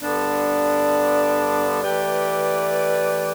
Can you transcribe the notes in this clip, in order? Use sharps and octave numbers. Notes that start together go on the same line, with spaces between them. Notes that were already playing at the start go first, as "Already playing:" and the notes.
G2 D3 B3 D4
E3 A3 G4 B4 D5